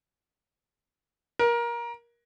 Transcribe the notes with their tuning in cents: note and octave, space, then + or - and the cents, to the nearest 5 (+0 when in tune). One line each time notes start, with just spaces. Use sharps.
A#4 +20